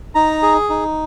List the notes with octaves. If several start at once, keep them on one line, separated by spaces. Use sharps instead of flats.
D#4 A#5
G#4
D#4